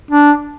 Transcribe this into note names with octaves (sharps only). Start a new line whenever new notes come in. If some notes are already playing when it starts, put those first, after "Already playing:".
D4